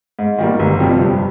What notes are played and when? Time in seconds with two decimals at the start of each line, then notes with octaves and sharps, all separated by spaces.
0.19 G#2
0.39 D#3 G3 A#3
0.59 G1
0.80 F2 C3 G3
1.00 G2